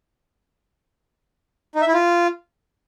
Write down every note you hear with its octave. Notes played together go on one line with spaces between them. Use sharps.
D#4
E5
E4
F4